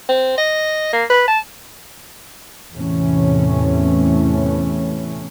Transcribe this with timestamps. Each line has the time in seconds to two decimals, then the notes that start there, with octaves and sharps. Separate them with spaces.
0.09 C4
0.38 D#5
0.93 A#3
1.10 B4
1.28 A5
2.73 E2 A2 C3 E3 A3 C#4